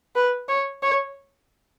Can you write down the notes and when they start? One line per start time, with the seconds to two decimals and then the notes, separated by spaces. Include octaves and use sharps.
0.16 B4
0.48 C#5
0.82 C#5